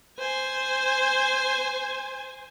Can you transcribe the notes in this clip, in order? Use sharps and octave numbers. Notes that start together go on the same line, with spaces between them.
C5 G#5